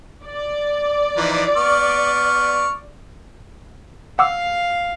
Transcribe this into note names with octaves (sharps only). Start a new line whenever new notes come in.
D5
E3 F3 D#4
B3 C#6 F6
F5 F#5 D6 E6